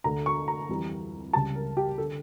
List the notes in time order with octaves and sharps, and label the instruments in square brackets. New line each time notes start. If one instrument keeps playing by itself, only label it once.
[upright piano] D2 D3 A3 A#5
C#6
A#5
F2 E3 G3
C#2 C#3 G3 A5
A#4
G4
D3 A4